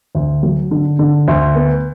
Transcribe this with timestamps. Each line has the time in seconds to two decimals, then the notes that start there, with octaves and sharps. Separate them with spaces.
0.15 D2
0.43 F#3
0.71 D3
0.99 D3
1.28 D2
1.55 B3